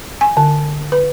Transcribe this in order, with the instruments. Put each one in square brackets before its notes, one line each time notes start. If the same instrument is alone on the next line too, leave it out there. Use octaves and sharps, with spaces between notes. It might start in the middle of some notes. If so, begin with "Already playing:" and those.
[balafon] G#5
D3
B4